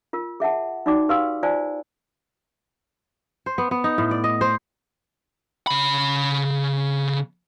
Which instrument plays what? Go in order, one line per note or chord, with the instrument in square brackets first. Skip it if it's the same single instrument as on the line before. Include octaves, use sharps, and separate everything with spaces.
[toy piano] F4 A#4
G#4 E5 F#5 A5
D#4 F#4 D5 G5 D6
G4 B4 F5 G5 C6 E6
F4 C5 D5 G#5 A5
[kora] C5
B3
B3
D#4
A2
D5
D#5
C5
[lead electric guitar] C#3 B5